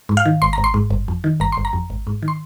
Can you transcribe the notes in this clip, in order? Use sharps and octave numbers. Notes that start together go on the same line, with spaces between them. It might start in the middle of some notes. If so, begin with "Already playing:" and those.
G#2
F5
D#3
G#1 C6
G#1 A#5
C6
G#2
G1
F2
D#3
G1 A#5
G1 C6
A#5
F2
G#1
G#2
D#3
C6